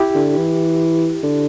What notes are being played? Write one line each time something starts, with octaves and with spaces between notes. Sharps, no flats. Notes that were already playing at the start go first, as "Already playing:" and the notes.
Already playing: E4 G4
D3
E3
D3